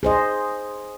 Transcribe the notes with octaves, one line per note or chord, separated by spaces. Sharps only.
G#4 C5 D#5